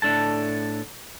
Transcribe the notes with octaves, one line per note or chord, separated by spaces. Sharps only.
A2 D4 A4 A5